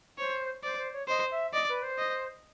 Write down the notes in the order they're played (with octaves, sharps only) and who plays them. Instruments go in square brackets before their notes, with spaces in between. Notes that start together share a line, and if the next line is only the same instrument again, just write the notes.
[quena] C5 [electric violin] C#5
[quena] C5 [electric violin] D5
[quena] C5
C#5
[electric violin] C5 [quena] D#5
[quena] E5
[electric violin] D5 [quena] D#5
[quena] B4
C5
[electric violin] D#5